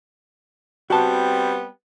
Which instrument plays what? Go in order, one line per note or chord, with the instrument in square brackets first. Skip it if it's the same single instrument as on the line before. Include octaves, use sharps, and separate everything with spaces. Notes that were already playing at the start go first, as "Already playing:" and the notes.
[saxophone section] G3 B3 C4 [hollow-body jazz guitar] F#4 A5